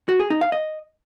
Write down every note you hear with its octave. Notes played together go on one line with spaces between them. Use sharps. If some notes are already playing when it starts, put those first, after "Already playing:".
F#4
G#4
D#4
F5
D#5